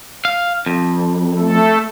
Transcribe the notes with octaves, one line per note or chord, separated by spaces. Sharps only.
F5
F2
A3 A4